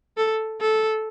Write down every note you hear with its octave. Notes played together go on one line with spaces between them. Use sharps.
A4
A4